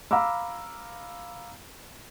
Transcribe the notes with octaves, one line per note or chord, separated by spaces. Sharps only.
F5 A#5 B5 D6 E6